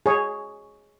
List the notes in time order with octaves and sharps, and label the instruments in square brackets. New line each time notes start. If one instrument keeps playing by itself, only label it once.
[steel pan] G#4 C#5